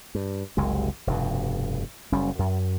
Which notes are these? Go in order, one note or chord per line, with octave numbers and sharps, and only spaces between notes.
G2
F#1 C2 C3 G#3
F1 G2 B2
F#1 G3 C#4
F#2